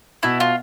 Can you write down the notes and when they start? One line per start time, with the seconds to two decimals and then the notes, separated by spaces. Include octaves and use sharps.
0.23 B2 E4
0.40 F4